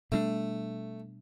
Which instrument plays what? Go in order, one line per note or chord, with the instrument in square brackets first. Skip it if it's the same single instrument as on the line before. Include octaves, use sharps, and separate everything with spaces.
[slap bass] B2 G3 B3 D4 [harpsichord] A3